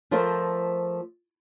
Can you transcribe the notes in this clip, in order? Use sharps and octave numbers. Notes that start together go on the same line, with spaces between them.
F3 A3 F4 A#4 C5